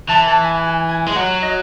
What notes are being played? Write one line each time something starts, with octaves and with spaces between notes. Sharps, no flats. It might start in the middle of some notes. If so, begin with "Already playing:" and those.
E3 A5
A5
G#5
G#5
G#5
G#3
F#3 F#5
D#5